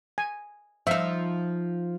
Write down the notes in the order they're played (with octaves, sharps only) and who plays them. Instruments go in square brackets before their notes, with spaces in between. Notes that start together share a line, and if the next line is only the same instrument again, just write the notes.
[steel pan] G#5
[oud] F3 D#4 [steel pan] E5